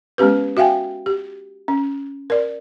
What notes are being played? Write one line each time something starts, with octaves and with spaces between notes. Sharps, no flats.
G#3 B3 C#4 G4 B4
F#4 E5 F5 G5 G#5
G4
C#4
A#4 D5